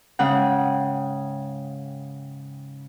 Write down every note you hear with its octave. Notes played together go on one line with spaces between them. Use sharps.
G#2 C#3 F#5 G5